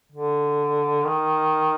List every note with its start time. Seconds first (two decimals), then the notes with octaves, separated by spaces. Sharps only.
0.12 D3
1.05 D#3